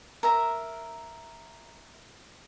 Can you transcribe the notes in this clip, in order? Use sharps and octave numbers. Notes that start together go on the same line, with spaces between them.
A#4 E5 A#5